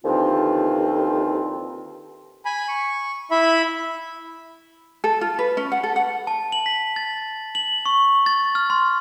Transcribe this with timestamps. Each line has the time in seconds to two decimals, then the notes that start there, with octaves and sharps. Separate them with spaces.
0.05 D#2 D3 E3 F3 C4 F4
2.45 G#5 B5
2.68 C#6
3.31 E4 E5 B5
5.04 A4
5.21 F4
5.39 B4
5.57 C#4
5.72 F#5
5.83 A4
5.96 F#5
6.27 A5
6.52 F#7
6.66 B6
6.96 A6
7.55 F#7
7.86 C#6
8.26 A6
8.55 F6
8.70 C6